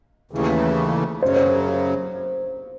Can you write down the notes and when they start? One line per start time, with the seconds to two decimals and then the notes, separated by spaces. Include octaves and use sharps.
0.31 D#2 C#3 E3 A3
1.22 F#2 C#3 F#3 C5
1.36 C5